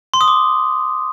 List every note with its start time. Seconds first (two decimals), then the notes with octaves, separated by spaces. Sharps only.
0.14 C6
0.21 D#6
0.28 D6